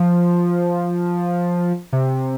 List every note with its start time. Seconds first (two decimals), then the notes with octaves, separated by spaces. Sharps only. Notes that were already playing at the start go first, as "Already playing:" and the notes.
Already playing: F3
1.93 C3